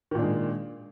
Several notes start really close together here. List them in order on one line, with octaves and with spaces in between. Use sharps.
D#3 A#2 D4 G#3